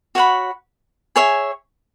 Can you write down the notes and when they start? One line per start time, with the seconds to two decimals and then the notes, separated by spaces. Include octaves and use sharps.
0.15 F#4 C#5 F#5 B5
1.16 G#4 C#5 E5 G#5